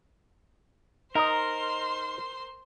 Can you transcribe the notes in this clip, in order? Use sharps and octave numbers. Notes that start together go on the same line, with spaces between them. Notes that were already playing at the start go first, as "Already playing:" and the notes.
D#4 A#4 C5 D#5 C6